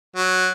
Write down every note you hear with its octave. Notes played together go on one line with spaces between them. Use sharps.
F#3